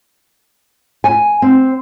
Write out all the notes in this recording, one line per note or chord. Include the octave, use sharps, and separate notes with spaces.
G#5
C4